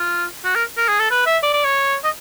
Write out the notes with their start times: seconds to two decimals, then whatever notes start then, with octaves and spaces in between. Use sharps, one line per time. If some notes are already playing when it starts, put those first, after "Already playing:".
Already playing: F4
0.45 F#4
0.56 A#4
0.78 A#4
0.89 G#4
1.00 A4
1.11 B4
1.27 E5
1.43 D5
1.54 D5
1.65 C#5
2.04 D#5